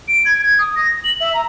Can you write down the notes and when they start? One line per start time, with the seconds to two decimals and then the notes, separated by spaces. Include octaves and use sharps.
0.08 D7
0.25 G#6
0.41 G#6
0.59 D#6
0.76 A#6
1.04 F#7
1.20 E5
1.34 A#5